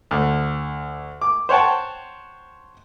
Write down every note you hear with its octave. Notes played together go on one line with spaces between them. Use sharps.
D2
D6
C5 C#5 F#5 G5 A5